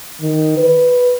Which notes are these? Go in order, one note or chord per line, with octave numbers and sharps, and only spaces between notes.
D#3
B4